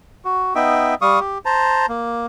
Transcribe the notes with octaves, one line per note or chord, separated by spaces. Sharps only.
F#4
B3 D#4 E5 G5
G3 F5 C#6 D#6
G4
C5 A5 A#5
A#3